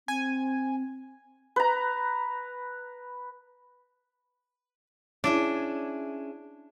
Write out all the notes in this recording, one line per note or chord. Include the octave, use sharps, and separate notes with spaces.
C4 G#5
B4 A#5
C#4 D4 E4 G#4